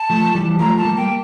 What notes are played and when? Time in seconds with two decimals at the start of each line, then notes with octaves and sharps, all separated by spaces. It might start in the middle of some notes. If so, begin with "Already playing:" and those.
Already playing: A5
0.10 F3 A3
0.35 E3 G3
0.59 F3 A3 A#5
0.78 A5
0.85 G3 A#3
0.97 A#3 G5